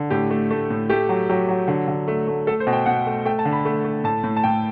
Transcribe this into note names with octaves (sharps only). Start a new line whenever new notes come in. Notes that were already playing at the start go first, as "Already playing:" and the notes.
Already playing: D3
A2 G4
A3
A3
A2
A3 G4
F#3
F#3 G4
F#3
D3
D3
A3
A3
A3 A4
C5
B2
G5
B2 F#5
A3
A3 G5
A5
D3
B5
A3
A3
A2 A5
A2
A5
A2 G5